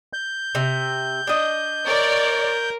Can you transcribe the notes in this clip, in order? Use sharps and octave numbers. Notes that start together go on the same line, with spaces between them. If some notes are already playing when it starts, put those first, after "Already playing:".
G6
C3
D4 D#5
A#4 C#5 D5